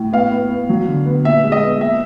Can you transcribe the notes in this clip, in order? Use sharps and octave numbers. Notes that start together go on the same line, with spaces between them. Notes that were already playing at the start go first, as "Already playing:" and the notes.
Already playing: A2
B3 F5
B3
B3
F#3
D3
B3
A#2 E5
G#3
D#5
B3
A#3 E5